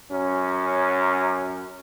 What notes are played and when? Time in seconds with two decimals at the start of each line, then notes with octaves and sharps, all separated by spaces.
0.12 F#2 C#4